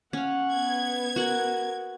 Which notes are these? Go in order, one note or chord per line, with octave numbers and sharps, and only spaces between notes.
C#4 F5 F#5
B3 G#6
F#4 A#4 F#5